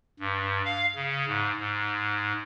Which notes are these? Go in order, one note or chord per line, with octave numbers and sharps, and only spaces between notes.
G2
F5
C#3
G#2
G#2